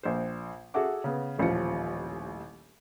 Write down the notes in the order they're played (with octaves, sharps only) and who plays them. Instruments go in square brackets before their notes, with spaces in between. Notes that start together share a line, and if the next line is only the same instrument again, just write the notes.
[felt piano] A#1 C5
F#4 G#4 A4 E5 F#5 D6
C#3 B3
D#1 A1 F3 C#7